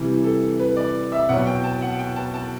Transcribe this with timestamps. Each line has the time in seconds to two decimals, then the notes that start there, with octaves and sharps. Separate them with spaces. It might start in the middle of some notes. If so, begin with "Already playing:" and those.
Already playing: C3 E3 G3
0.24 A4
0.60 B4
0.77 D5
1.12 E5
1.29 B2 F#3 F#5
1.47 G5
1.64 A5
1.82 F#5
1.99 G5
2.16 A5
2.34 A5